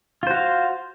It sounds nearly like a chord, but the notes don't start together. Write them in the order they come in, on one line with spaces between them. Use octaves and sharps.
F4 C5 F#4 F5